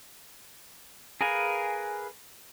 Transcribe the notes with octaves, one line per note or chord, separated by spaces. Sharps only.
G#4 A#4 B4 F5 G#5